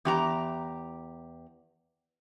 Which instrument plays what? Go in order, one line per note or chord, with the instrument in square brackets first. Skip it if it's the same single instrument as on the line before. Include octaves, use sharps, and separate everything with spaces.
[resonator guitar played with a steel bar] E2 G4 A#5